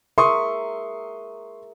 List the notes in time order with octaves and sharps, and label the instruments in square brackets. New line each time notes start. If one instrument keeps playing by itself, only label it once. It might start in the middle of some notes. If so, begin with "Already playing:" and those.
[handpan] G#4 A#4 E5 [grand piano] C6 C#6 D#6